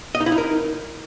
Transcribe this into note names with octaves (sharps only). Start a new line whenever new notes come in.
D#5
D#4
E4
D#4
A#4